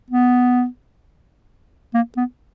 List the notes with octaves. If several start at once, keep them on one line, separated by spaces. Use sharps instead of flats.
B3
A#3
B3